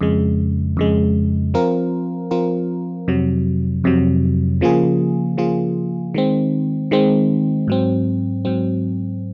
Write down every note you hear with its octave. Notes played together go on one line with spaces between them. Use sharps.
F2 C#3 G#3
F2 C#3 G#3
F3 C4 F4 A#4
F3 C4 F4 A#4
F2 C3 F#3
F2 C3 F#3
C#3 F3 A#3 F4 G#4
C#3 F3 A#3 F4 G#4
D#3 G#3 C4
D#3 G#3 C4
G#2 F#3 C4
G#2 F#3 C4